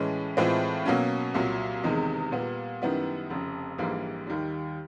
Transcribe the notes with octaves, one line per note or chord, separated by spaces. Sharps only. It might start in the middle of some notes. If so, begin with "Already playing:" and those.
Already playing: A2 E3 G#3 C#4
A2 E3 G#3 C4 F4
B2 F#3 A#3 C#4
C2 A#2 F#3
E1 E2 C3 D#3 G#3
A#2 G3 B3
F#2 D#3 G3 B3 E4
F1 F2 C#3
A#1 G#2 E3 G3 A#3
D#2 D#3 G3